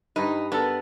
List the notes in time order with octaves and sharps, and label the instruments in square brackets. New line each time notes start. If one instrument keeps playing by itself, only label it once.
[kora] G2 B4 [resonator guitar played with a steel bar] D#4
[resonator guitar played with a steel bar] B3 [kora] D4 A4 A#4